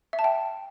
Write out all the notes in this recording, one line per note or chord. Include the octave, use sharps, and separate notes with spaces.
E5
A5
G5